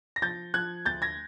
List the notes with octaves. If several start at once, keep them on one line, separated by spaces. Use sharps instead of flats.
A#6
F3 G6 A6
F3 F#6 G#6
D2 G6 A6
G#6 A#6